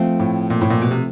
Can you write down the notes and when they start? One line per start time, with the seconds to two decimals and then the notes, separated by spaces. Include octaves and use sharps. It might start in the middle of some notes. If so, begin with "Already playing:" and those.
Already playing: F3 A3 C4 F4
0.20 A2
0.50 A#2
0.61 A2
0.70 A#2
0.82 B2
0.91 C3